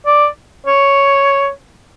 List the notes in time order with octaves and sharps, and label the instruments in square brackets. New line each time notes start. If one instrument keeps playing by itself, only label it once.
[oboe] D5
C#5